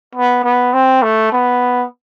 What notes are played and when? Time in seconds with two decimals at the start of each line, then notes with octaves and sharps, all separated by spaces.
0.15 B3
0.44 B3
0.73 C4
1.02 A3
1.32 B3